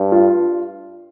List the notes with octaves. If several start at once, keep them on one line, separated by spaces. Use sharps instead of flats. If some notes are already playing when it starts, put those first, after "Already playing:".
Already playing: G2
F4